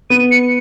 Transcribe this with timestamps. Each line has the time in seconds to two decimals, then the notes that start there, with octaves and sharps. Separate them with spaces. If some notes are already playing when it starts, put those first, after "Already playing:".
0.10 B3 D#7
0.31 C#7